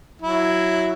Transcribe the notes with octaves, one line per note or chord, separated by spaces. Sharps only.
F#3 E4